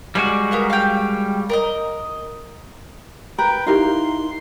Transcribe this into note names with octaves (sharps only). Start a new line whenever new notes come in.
G3 G#3 F#4 D5 F5
B3 A#4 F5
F5 G5
A#4 D5 D#5
A#4 B4 G5
D#4 E4 G4 A#4 F5 C6